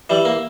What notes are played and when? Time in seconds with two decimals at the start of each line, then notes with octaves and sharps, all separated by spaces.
0.10 E3 G3
0.25 A#3